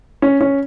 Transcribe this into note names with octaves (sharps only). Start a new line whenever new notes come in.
C#4
C#4